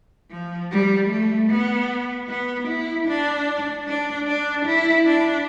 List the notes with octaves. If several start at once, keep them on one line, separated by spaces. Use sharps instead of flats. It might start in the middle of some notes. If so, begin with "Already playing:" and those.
F3
G3
A3
B3
B3
E4
D4
D4
D4
E4
D4